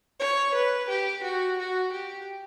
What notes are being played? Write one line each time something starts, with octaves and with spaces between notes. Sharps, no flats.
C#5
B4
G4
F#4
F#4
G4